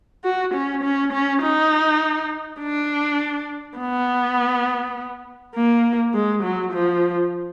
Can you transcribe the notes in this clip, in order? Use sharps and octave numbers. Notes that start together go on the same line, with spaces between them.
F#4
C#4
C#4
C#4
D#4
D4
B3
A#3
G#3
F#3
F3